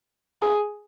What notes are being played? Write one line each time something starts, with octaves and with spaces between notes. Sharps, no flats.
G#4